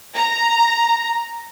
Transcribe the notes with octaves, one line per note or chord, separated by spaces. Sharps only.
A#5